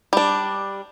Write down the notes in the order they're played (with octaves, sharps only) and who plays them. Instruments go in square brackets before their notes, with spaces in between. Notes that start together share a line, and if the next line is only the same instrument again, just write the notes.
[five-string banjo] G3 D4